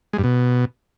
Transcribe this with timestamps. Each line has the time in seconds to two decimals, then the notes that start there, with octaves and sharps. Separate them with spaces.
0.13 G#3
0.18 G2
0.24 B2